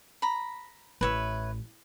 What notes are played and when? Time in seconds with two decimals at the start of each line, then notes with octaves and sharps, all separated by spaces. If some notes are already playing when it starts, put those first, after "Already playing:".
0.22 A#5 B5
1.01 A1 B4 C#5 E5